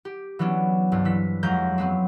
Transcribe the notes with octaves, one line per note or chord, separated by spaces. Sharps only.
G4
E3 F#3 B3 C#4 D4
C2 G2
E3 B6
F2 F3 F#3 G#3 A#5 G6
F#3 B3 C4